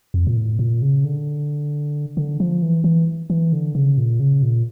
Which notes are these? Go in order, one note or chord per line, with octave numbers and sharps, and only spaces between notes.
F2
A#2
A2
A#2
C#3
D3
D3
F3
E3
E3
E3
D3
C#3
A#2
C#3
A#2